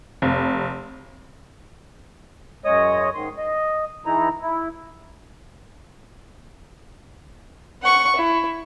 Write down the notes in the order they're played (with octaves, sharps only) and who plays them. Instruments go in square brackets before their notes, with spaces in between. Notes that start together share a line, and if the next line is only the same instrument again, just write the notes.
[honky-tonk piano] F1
[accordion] F#2 G#3 C#5 D#5 D#6
G#2 D#3 C6
D#5
E3 G#3 D#4 E4 A#5
E4
[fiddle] F#5 C#6
E4